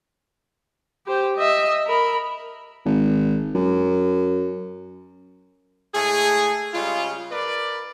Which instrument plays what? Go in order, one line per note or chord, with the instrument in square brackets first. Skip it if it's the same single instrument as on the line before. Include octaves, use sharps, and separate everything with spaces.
[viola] G4 C5
D#5 E5
A#4 B5
[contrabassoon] G#1
F#2
[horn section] A2 G#3 A3 G#4
C#3 G3 G#3 F4
A#4 B4 D5